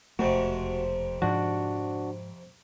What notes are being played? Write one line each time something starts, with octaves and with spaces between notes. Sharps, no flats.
E1 F2 C3 A3 F#4
G#2 F3 D4 F#4